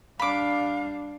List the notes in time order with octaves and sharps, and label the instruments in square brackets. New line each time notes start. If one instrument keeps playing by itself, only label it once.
[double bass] G3 D4 [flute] F5 [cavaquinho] B5 D6